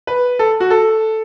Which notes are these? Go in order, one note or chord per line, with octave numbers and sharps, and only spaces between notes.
B4
A4
F#4
A4